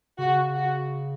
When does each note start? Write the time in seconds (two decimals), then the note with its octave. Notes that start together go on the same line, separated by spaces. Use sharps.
0.19 C#3 F#4
0.55 F#4